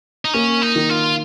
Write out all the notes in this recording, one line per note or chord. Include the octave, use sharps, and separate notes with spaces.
D#4
A#3 C#4
D#4
D#3
F4